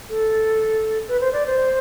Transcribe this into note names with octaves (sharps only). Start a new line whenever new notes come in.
A4
B4
C5
D5
C5